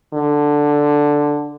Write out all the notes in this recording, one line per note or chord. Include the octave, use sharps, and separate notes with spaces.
D3